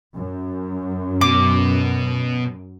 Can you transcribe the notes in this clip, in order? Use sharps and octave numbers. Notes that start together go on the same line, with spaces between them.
F#2
B2 D6